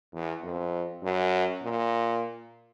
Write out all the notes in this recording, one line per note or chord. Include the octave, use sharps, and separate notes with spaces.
E2
F2
F#2
A#2